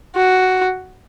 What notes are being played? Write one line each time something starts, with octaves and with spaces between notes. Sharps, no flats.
F#4